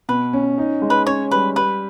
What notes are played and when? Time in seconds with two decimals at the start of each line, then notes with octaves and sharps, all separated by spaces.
0.09 B2 B4
0.33 C#4
0.58 D#4
0.82 G#3
0.90 B4
1.06 C#4 C#5
1.31 G3 B4
1.55 G3 B4